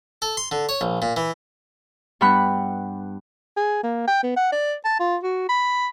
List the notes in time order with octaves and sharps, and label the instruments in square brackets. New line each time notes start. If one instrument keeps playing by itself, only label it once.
[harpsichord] A4
C6
D3
C#5
A#1
A#2
E3
[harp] G2 B3 F#5 B5 F#6
[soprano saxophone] G#4
A#3
G5
B3
F#5
D5
A5
F4
F#4
B5